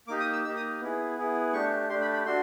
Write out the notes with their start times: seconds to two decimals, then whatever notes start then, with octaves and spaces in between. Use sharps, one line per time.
0.08 A#3 D#4 G4 D6
0.20 D#6
0.33 E6
0.45 A#3 D#4 G4 E6
0.57 D#6
0.81 B3 E4 G#4
1.17 B3 E4 G#4
1.53 A3 D4 G4 C#6
1.89 A3 D4 G4 C6
2.01 B5
2.13 B5
2.26 D4 F#4 A4 C6